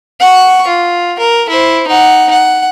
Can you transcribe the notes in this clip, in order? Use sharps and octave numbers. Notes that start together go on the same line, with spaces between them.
F#5 C#6
F4
A#4
E4 C5
D#4 F#5
F#5